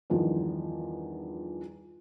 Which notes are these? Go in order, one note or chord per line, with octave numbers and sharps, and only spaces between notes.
E2 G2 D#3 F3